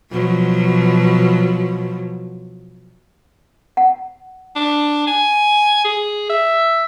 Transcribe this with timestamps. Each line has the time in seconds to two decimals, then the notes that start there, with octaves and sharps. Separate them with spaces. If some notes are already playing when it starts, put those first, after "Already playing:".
0.11 B2 F3 F#3
3.77 F#5
4.55 D4
5.07 G#5
5.85 G#4
6.30 E5